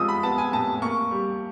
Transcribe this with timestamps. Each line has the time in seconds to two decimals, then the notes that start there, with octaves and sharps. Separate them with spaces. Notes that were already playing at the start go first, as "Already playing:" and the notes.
Already playing: F3 G#3 D#6 E6
0.09 B5
0.23 B3 A5
0.38 G#5
0.53 A2 A5
0.82 A#3 C#6
1.11 G3